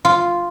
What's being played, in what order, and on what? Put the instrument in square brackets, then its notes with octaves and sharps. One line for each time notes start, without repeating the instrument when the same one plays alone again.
[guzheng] F4